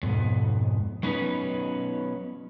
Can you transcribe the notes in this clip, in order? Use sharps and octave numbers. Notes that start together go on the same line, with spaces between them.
F2 G#2 B2
F#3 B3 C#4 D#4 B4